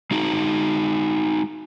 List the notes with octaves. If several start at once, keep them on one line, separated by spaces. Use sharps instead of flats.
G#3 D#4 F#4 G#4